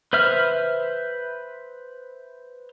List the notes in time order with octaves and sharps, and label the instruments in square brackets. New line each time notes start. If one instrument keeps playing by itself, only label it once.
[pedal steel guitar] B4 C5 E5 F6